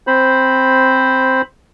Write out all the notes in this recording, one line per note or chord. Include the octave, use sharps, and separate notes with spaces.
C4 C5 B5